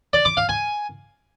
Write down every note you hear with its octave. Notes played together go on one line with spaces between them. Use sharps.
D5
D6
F5
G#5